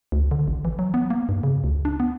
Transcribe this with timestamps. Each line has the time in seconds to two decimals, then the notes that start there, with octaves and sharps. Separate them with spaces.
0.12 D2
0.31 D3
0.48 A1
0.65 E3
0.79 F#3
0.94 B3
1.10 A#3
1.29 G2
1.43 C#3
1.64 D2
1.85 D4
2.00 B3